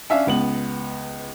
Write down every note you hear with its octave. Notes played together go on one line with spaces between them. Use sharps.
C#4 D4 E5 F5
C#2 B3 F#7